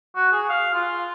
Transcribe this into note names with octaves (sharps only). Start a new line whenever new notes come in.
F#4
G#4
F5
F4